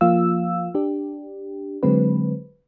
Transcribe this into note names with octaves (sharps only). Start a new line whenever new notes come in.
F3 A#3 F4 F5 E6
D4 G4
D3 F#3 G#3 C4 B4